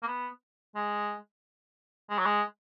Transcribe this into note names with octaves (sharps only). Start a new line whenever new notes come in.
A#3
B3
G#3
G#3
F#3
G#3